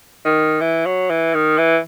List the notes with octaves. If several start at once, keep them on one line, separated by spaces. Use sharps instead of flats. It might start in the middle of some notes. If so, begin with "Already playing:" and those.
D#3
E3
F#3
E3
D#3
E3